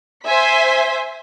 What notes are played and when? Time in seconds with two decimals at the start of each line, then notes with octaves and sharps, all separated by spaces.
0.24 C5 E5 G#5 B6